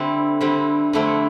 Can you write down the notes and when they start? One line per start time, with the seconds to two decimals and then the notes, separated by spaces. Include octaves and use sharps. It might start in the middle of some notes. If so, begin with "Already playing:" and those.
Already playing: D3 G3 C4 E4
0.41 D3 G3 C4 E4
0.93 F2 D3 A3 C4 E4